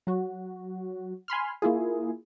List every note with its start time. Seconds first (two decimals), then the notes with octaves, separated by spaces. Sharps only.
0.07 F#3 F#4
1.28 G#5 B5 C6 F6
1.62 A#3 E4 F4 G#4